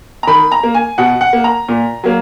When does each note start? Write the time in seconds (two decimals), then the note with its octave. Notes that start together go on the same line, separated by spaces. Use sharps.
0.23 A#5
0.27 D#3 B5
0.52 A#5
0.63 A#3
0.74 G#5
0.98 B2 F#5
1.21 F#5
1.33 A#3
1.44 A#5
1.69 A#2
2.04 F#3 A#3